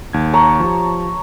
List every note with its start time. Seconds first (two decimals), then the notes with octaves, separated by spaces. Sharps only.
0.13 D#2 G#6
0.33 C#5 A5 A#5
0.60 F3 G4